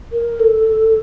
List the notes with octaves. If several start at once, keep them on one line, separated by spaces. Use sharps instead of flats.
A#4
A4